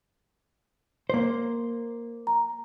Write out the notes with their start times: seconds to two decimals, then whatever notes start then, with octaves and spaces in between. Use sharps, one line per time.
1.10 A#3 C5
2.27 A#5